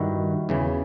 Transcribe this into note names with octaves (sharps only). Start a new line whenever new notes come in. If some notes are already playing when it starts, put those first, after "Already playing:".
Already playing: G2 D#3 E4 F#4
E2 C#3 E3